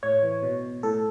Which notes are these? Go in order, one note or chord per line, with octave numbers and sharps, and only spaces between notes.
A2 C#5
E3
B2
A2 A4